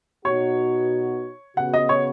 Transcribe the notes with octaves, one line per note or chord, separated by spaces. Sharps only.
B2 B3 D#4 F#4 C#5
C#3 B3 F#4 F#5
D#5
C#5